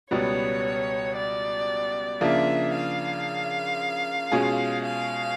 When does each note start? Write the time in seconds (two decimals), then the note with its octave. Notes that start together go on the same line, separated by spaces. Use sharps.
0.10 C#2 B2 G3 B3 C#5
1.16 D5
2.21 C#3 F3 A#3 D4 F4 E5
2.73 F5
4.32 B2 G#3 C#4 F4 G#4
4.84 F5